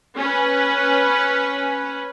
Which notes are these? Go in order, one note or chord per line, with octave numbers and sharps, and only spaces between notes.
C#4 B4